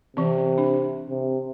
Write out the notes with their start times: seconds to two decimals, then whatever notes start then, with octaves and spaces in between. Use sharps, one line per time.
0.17 C3 E3 C4
0.58 D4
1.10 C3